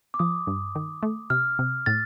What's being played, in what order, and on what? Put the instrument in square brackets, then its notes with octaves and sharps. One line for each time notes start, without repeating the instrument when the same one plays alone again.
[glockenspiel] D6
[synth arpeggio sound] F3 [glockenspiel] D#6
[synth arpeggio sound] G2
D#3
A3
[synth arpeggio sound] C3 [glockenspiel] F6
[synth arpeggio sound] C3
[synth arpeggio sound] A2 [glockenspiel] A6